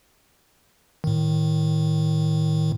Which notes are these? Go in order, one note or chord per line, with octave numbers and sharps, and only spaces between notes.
A2 D#3